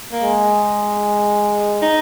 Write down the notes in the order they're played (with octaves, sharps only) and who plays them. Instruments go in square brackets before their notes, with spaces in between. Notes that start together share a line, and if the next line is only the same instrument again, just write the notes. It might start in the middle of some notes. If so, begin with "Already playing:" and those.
[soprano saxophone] A#3
[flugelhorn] G#3
[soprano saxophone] D#4